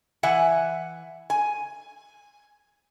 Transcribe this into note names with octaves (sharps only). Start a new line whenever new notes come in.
E3 E5 F#5 G#5
G#5